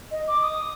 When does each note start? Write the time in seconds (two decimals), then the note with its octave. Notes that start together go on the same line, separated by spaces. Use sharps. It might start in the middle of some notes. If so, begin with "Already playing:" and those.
0.11 D#5
0.28 D6
0.42 D#6